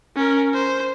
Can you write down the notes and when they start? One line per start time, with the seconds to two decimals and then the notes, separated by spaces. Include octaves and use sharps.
0.16 C#4 A#4
0.54 C5